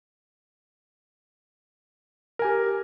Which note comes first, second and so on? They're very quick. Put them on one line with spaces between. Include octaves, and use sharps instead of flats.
A#4 G#5 G4